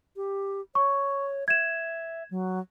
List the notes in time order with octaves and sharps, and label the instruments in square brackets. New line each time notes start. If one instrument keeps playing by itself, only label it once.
[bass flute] G4
[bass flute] C#5 [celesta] C#6
[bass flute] E5 [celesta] G#6 E7
[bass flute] F#3